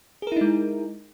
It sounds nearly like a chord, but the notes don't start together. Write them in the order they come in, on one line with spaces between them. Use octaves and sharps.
G#4 A#4 E4 D#4 G#3